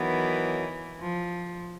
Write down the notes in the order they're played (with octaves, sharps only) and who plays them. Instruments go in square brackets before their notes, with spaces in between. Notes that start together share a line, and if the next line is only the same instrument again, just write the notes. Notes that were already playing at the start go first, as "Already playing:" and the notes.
Already playing: [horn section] D#3 F#3 B3 [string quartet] E3
[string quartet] F3